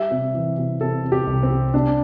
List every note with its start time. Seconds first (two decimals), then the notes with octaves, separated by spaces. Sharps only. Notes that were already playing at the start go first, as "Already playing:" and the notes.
Already playing: G3 E5
0.11 C3
0.34 E3
0.58 C3
0.81 C3 A4
1.04 C3
1.12 G4
1.27 C2
1.43 C4
1.51 G3
1.74 C3 D4